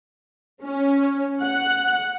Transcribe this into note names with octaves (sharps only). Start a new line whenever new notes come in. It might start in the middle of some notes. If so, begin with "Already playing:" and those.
C#4
F#5